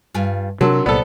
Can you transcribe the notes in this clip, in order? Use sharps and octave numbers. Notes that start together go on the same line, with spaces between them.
G2 F4 G#5
C3 F#3 C#4 D4 A#4 A5 C6 E6
C2 A#2 F#3 B3 A4 C5 D5